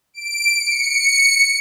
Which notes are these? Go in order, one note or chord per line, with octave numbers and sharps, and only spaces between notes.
D7
C#7